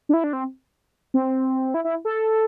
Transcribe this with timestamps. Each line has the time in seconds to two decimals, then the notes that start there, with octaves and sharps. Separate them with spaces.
0.09 D4
0.14 E4
0.24 D4
0.33 C4
1.14 C4
1.74 E4
1.84 E4
2.05 A4